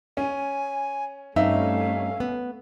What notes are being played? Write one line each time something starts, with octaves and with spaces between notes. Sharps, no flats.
C#4 G#5
G2 A3 C4 C#4 D#4 E5 F5
B3